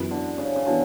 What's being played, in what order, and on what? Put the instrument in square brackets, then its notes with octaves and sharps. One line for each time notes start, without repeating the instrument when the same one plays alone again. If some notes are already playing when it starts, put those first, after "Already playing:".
Already playing: [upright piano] F#2 E3 B3 F#4
[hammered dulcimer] D3
C#3
C#3
[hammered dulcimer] D3 [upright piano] E3 B3 F#4